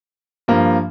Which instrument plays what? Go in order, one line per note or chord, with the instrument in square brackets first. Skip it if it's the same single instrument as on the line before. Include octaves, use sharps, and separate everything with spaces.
[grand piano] G2 F3 A#3